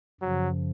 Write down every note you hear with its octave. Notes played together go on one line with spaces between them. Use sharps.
F#2 C#3 F3 F#3